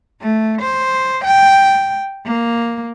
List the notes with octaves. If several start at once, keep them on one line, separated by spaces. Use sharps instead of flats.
A3
C5
G5
A#3